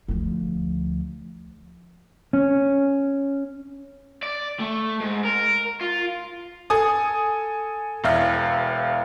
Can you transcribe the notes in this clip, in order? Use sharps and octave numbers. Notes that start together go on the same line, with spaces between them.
D2 F3
C#4
D5
A3
G#2
A#4
F4
A4 G#5 D#6
E1 E2 E5 F5